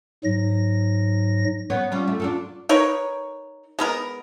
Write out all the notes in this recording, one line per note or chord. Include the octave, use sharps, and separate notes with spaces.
G#2 F#3 A#6
B3 C#5
G3 C#4 F4
A3
D4 F4 A4
D#4 A#4 B4 C#5
G#3 B3 A#4